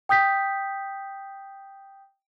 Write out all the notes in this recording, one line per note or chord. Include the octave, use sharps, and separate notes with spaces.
G5 D#6 G6 B6